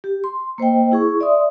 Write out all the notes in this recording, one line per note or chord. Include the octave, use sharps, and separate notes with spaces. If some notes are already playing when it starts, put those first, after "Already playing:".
G4
C6
A#3 C5 D#5 G5
E4 G#4 C#6
D5 E5 C6 D#6